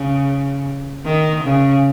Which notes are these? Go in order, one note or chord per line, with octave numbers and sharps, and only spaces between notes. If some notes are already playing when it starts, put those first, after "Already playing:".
Already playing: C#3
D#3
C#3